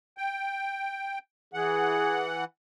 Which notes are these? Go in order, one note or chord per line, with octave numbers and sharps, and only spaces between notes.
G5
E3 G#4 F#5